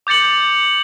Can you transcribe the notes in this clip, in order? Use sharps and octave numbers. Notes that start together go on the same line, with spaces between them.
D6 G6 A6 C#7 F#7